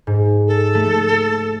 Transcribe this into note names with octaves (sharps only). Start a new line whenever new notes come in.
G#2
A4
A3